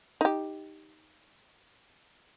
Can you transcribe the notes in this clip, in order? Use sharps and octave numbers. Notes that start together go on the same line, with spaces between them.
D#4 G4